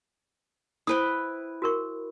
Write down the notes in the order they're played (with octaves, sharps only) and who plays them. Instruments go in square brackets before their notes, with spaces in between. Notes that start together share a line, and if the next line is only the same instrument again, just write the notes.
[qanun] E4 B4 G5 [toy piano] C5 D#6
[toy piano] F#4 A#4 C#6